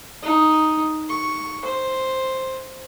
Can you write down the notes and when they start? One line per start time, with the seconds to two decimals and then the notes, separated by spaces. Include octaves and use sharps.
0.22 D#4
1.09 C#6
1.65 C5